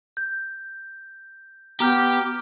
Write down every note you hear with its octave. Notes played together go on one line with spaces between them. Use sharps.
G6
B3 G4 A#5 F6 G6